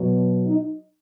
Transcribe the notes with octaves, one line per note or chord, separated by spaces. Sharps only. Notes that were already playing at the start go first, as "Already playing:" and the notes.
Already playing: B2 F#3
D#4